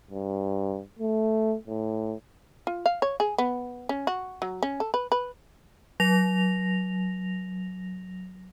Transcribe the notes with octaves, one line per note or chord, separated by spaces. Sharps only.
G2
A3
A2
F4
F5
C#5
G#4
B3
C#4
F#4
F#3
C#4
A4
B4
B4
F#3 A#6 F7